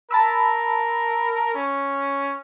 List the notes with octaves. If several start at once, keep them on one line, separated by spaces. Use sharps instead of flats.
A#4 A5 B5 E6
C#4